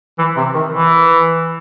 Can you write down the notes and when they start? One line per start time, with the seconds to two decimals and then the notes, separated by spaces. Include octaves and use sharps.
0.18 E3
0.37 C3
0.54 D#3
0.73 E3